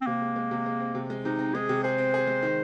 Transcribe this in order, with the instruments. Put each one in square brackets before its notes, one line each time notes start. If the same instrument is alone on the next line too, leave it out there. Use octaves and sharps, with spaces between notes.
[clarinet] C4
[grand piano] C3 [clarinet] A#3
[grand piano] G#3
G#3
C3
G#3
C4
C3
G#3
[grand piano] C3 [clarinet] D#4
[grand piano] C4
[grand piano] G#3 [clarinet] G#4
[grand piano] C3
[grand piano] G#4 [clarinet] C5
[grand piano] C4
G#4
G#3
D#3